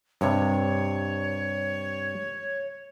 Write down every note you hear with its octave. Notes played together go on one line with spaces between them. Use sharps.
G2 C3 C#5